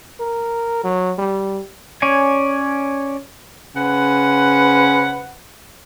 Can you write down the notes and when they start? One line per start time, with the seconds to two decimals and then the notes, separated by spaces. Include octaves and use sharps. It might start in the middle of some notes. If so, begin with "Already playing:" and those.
0.20 A#4
0.84 F#3
1.18 G3
2.02 C#4 C#5 D5 G#5
3.75 C#3 B4 C5 F#5